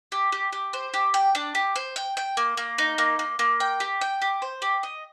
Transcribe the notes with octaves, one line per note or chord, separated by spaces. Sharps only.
G4
G4
G4
C5
G4
G5
D4
G4
C5
G5
G5
A#3
A#3
D#4
A#3
A#3
A#3
G5
G4
G5
G4
C5
G4
D#5